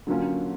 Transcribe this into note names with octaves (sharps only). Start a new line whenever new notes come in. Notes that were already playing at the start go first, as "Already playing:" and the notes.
D3 F#3 A#3 C#4 F4